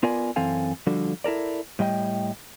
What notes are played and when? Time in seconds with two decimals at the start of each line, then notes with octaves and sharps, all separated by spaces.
0.03 B3 F4 A#4 D5 G#5
0.36 F#2 E3 C4 A4 F5 G#5
0.87 D3 F3 G3 D4 F#4 A4
1.24 E4 A4 A#4 D5
1.79 A2 G3 D#5 G5